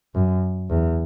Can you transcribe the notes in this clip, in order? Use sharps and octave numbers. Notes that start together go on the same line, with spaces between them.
F#2
E2